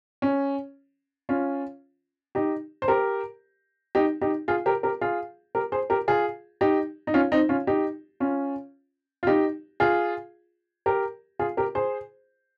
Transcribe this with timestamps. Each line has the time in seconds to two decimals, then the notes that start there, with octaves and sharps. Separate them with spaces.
0.22 C#4
1.29 C#4 F4
2.35 D#4 G4
2.82 C5
2.88 G4 A#4
3.95 D#4 G4
4.21 D#4 G4
4.48 F4 G#4
4.66 G4 A#4
4.83 G4 A#4
5.01 F4 G#4
5.55 G4 A#4
5.72 G#4 C5
5.90 G4 A#4
6.08 F4 G#4
6.61 D#4 G4
7.07 D#4
7.14 C#4 F4
7.32 C4 D#4
7.49 C#4 F4
7.67 D#4 G4
8.20 C#4 F4
9.23 F4
9.27 D#4 G4
9.80 F4 G#4
10.86 G4 A#4
11.39 F4 G#4
11.57 G4 A#4
11.75 G#4 C5